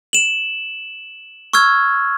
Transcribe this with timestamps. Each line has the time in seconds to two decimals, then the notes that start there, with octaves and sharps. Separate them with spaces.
0.13 E7 F#7
1.53 C#6 E6 F6 G#6